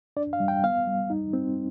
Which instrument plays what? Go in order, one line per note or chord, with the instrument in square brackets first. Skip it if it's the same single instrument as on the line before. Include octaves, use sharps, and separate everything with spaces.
[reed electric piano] D4 D5
F5
G3
G5
B3 F5
G3
D#4
C4